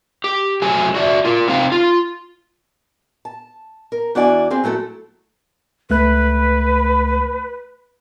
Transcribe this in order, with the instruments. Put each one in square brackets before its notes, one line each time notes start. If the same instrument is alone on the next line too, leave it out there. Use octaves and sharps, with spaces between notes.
[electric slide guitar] G4
F#3 A3 C5 G#5
F#4 D5 E5
F4 A#4
C4 D#4 C5 F5 G5
F4
[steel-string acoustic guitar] A5
A#4
E2 D4 E4 F#4 D5 G#5
C4 F4 G#4
F#3 A3 E4 A4
[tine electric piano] C#2 A3 F#6 [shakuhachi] B4